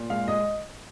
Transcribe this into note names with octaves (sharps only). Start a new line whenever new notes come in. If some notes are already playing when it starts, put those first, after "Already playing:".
Already playing: A#2
G#3 F5
G#3 D#5